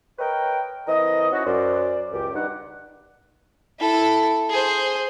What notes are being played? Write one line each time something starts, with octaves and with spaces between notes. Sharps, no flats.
A#4 B4 C#5 D#5 G5
E3 C4 A#4 D#5
C#4 D#4 E4 F#4
F#2 C5 D5
C#2 F#2 G4
G2 D#3 F#5
E4 A4
G#4 C5